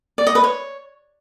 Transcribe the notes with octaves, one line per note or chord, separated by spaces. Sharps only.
D5
D#5
B4
C#5